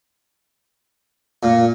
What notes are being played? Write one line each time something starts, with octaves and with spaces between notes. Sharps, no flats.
A#2